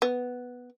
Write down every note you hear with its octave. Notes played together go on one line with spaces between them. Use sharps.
B3